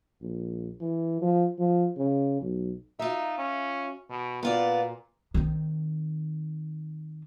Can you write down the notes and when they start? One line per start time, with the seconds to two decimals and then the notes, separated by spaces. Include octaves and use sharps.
0.21 A#1
0.81 E3
1.21 F3
1.59 F3
1.97 C#3
2.42 B1
2.99 D#4 F4 E5
3.38 C#4
4.10 B2
4.43 A#2 B3 F4 D5
5.34 D#3 C4